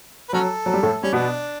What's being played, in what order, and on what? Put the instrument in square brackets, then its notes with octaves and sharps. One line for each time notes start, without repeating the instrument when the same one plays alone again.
[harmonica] B4
[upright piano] F#3 [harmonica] C#4 F#4 A4
[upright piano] F#3
G3
A2 A3
[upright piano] G3 [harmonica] C#4
[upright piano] B2 B3 [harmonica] D4